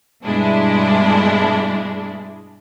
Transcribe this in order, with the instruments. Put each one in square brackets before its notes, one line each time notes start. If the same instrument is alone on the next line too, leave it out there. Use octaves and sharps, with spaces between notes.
[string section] G2 B2 G#3 D4 E4